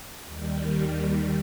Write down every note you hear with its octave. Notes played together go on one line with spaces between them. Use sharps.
D#2 D#3 G3